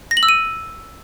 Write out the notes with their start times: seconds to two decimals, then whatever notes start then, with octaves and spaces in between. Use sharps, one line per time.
0.11 A#6
0.17 F#7
0.23 E6
0.29 D#7